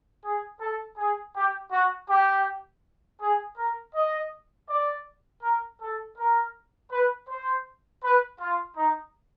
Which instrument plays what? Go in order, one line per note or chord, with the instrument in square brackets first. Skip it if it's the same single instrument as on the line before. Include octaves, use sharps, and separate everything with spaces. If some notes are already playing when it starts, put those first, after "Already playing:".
[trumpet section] G#4
A4
G#4
G4
F#4
G4
G#4
A#4
D#5
D5
A#4
A4
A#4
B4
C5
B4
F4
D#4